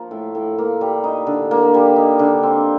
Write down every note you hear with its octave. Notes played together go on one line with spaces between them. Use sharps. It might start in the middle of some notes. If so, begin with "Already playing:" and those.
Already playing: F3 A#3
A2
A2
A#3
G3
D#4
D3
A#3
G3
D#4
D3
C4